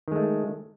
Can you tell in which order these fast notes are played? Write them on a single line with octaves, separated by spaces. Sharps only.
D#3 G#3 A3